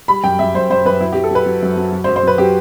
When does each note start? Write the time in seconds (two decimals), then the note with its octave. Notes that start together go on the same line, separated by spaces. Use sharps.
0.08 G3 B5
0.24 F#2 G5
0.39 F#2 E5
0.54 F#2 C5
0.70 F#2 C5
0.85 F#2 B4
1.00 F#3 E4
1.12 F#3 G4
1.24 A4
1.31 F#3 B4
1.46 F#3
1.63 F#2
1.77 F#3
1.92 F#3
2.04 C5
2.08 F#2
2.16 C5
2.23 F#3 B4
2.38 F#3 G4